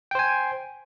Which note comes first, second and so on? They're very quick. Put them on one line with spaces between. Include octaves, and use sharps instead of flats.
G5 C5 G#5